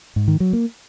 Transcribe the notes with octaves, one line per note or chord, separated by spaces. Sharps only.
G#2
D#3
F#3
A#3